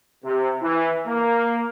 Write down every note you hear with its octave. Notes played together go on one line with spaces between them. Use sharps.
C3
E3
A#3